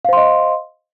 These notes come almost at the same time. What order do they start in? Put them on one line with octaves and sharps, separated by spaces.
F5 C5 C6 D#5